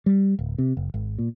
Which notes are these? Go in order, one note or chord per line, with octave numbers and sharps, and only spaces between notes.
G3
D1
C3
F#1
G#1
A#2